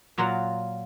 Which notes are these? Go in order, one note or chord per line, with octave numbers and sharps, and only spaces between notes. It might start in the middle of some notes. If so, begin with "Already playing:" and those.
A#2 F#3 F4 A#4 F#5